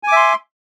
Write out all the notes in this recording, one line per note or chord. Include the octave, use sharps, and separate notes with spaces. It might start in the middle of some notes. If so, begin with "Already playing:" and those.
E5 G#5 C6 D6